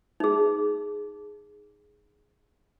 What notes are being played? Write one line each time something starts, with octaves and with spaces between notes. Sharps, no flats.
D#4 G#4